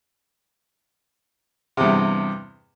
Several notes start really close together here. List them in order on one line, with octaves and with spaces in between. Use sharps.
C3 E2 G2